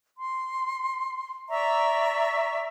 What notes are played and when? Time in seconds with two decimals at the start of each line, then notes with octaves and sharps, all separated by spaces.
0.18 C6
1.49 D5 E5 A#5 C#6